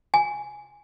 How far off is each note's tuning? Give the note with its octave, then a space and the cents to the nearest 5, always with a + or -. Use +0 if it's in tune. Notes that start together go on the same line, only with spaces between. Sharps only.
G#5 +0